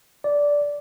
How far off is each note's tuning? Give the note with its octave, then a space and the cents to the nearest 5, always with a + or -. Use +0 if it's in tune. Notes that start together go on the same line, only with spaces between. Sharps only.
D5 -10